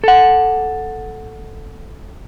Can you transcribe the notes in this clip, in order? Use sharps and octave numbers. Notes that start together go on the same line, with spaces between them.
A4 F#5